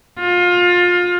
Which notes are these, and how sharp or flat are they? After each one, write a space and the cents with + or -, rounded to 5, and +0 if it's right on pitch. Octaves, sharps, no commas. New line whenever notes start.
F4 +25